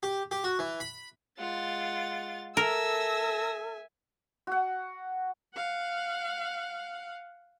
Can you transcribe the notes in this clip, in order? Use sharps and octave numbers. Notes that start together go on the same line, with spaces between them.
G4
G4
F#4
E3
B5
G#3 F4 F#5 A6
A4 A#4 E5 G#5 E6 A#6
F#4 F#5
F5 F#5